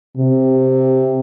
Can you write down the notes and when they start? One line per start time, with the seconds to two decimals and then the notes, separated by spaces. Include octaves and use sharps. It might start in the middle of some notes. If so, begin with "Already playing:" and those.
0.17 C3